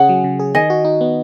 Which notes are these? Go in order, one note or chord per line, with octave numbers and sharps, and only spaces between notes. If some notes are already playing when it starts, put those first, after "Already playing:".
Already playing: C#3 C#4 G#4 F#5
F#3
C#3
G#4
D#3 D#5 G#5
F#4
D#4
B3